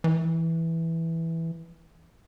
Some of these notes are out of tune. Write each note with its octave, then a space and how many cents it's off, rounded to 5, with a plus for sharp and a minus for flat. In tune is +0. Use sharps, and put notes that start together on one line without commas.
E3 -5